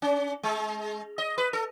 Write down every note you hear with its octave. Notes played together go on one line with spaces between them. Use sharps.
C#4
G#3
D#5
B4
A4